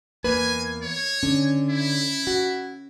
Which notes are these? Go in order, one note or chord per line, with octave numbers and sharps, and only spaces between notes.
E2 A#3 B4 G#5
C#5
D3 C#4
E4
F#4